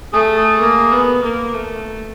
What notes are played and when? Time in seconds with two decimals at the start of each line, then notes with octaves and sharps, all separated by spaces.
0.13 A3 G#4
0.36 G#4
0.60 A#3
0.92 B3
1.23 A#3
1.54 A3